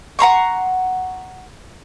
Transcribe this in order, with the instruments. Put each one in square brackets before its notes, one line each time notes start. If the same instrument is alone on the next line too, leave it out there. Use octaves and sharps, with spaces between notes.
[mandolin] F#5 A#5 C6 C#6